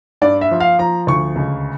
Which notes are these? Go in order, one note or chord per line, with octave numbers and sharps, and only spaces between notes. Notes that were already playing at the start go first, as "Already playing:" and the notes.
G2 D5
E5
F3
F5
F3 A#5
D2 C#6
C#2